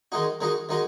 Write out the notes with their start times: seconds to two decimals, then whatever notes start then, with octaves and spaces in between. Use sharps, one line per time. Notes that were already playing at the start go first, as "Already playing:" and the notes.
0.12 D#3 G#3 D#4 F#4
0.41 D#3 G#3 D#4 F#4
0.69 D#3 G#3 D#4 F#4